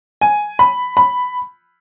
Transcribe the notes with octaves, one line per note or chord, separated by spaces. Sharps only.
G#5
B5
B5